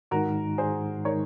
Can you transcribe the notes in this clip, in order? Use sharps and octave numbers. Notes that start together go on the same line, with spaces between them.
G#2 D#3 G#3 D#4 F#4 A#4
G#4 C5
D#3 G#3 D#4 A#4 C#5